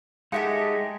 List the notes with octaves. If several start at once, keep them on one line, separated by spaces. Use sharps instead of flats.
G#3 D#4 G4 A4 E5 F#5